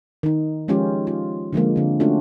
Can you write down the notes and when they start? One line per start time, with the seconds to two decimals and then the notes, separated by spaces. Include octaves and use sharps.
0.23 D#3 D#4
0.68 F3 G#3 C#4 F4 G4
1.07 F4
1.53 D3 F3 G#3 A#3
1.76 D3 C4
2.00 A3 C#4 D4 F4 F#4